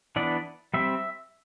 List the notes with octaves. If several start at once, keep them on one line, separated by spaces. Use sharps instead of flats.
E3 B3 D4 D5
G3 C4 E5